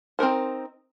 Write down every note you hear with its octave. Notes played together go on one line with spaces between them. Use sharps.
C4 D#4 A#4 C5